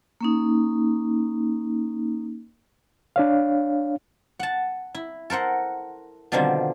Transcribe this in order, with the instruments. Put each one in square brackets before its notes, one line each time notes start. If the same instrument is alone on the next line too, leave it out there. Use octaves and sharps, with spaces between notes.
[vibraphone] A#3 C#4 D#4
[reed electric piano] D4 C#5 F5
[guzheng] F#5 A5
E4
A4 A#4 C5 F#5
B2 D3 D#3 F3 G3 C4